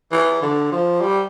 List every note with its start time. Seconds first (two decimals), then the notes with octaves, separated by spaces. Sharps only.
0.12 E3
0.42 D3
0.72 F3
1.01 G3